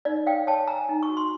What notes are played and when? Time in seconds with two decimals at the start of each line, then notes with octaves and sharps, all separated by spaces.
0.05 D#4 D5
0.26 C#5 F5 G5
0.47 C#5 G5 A5
0.68 C#5 G#5 A#5
0.89 D#4
1.03 C#6
1.09 F#4
1.17 C6